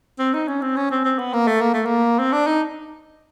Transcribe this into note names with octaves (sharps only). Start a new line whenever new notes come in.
C4
D#4
C#4
C4
C#4
C4
C4
B3
A#3
A3
A#3
A3
A#3
C4
D4
D#4